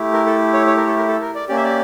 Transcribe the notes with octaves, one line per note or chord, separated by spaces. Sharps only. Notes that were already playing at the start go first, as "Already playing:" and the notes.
Already playing: A3 E4 G4
A#4
A4
C#5
C#5
A#4
A4
A#4
A4
A#4
D5
A#3 C#4 G4 D5
E5
D5